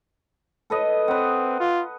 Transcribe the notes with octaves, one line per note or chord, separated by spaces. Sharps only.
A4 B4 D#5
C4 B4 F#5
F4